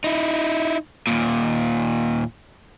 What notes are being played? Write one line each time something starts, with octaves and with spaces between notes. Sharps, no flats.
D#4 E4
D#2 A#2